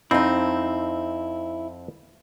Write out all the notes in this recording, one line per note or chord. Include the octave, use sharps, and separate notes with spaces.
F2 C4 D#4 E4